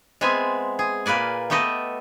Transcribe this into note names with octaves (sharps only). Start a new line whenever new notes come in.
G#3 B3 C4 E5 G#5
G#4
A#2 A#3 B4 D5 G#5
A3 B3 G4 A4 D#5